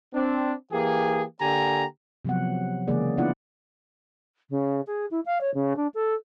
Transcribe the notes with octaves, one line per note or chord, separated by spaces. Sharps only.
C4 D4
E3 A#3 G4 G#4
D3 A#3 G4 G#5 A#5
C3 F3 F#3 B3 F#5
C#3 E3 G#3 A#3 G#4 D5
B3 D4 E4 F4 D5 F#5
C#3
G#4
E4
F5
C#5
C#3
D4
A4